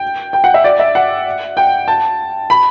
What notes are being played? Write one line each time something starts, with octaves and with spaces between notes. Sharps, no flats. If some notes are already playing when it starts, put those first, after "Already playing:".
Already playing: G5
G5
F#5
E5
D5
E5
F#5
G5
A5
B5